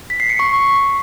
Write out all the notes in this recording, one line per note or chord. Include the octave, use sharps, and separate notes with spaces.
B6
C7
C#7
C#6